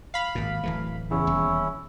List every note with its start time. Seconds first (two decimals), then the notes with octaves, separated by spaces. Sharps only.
0.14 F5 B5
0.35 G#1 A#2
0.63 D1 E3 A3
1.11 E2 C#3 C#4 E4
1.27 D#1